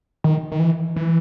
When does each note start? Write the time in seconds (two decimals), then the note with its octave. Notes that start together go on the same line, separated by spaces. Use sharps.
0.24 D#3
0.52 D#3
0.59 E3
0.96 E3